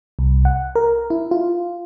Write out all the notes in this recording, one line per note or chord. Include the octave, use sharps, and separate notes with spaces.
C2
F#5
A#4
E4
F4